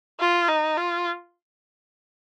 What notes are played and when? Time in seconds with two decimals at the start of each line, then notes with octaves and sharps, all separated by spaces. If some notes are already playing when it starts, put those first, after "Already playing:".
0.20 F4
0.48 D#4
0.77 F4